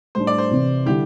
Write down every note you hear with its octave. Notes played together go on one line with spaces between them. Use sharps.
A2 G3 D4 C5
D5
C5
C3 E3 C4 E4
D3 G3 E4 G4